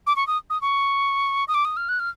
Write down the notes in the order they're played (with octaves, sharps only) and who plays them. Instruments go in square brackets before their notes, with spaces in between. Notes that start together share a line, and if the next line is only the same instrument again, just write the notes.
[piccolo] D6
C#6
D#6
D#6
C#6
D#6
D6
D#6
F6
F#6
F6